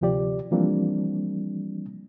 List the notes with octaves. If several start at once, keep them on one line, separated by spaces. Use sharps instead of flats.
D2 C3 F3 G4 D5
E3 F3 G3 A#3 C4 D4